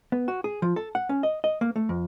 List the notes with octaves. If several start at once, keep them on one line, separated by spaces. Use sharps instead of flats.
B3
F#4
G#4
F3
A4
F#5
C#4
D#5
D#5
A#3
A3
F2